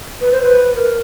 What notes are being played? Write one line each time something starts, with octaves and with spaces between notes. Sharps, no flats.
B4
C5
B4
A#4